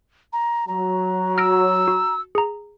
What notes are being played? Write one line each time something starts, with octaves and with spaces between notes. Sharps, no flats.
A#5
F#3 A#5
E6 F6 A#6 D7
F#4
G#4 A#5